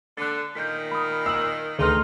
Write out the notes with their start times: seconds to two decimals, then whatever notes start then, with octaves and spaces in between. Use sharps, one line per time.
0.17 D3 F#6 A6
0.55 A#2 D#3 G6 B6
0.92 B5 D#6
1.26 E6 C7 F#7
1.79 D2 D#4 G#4 A4 B4 C6 F6